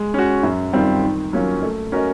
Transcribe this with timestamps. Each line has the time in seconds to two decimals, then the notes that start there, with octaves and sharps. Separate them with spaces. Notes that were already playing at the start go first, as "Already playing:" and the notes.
Already playing: G#3
0.14 C#4 F#4
0.43 F#2
0.73 D#3 G3 C4 F4
1.02 D#3
1.33 F#3 A#3 C#4 F4
1.62 A3
1.92 C#4 F#4 A#4 D#5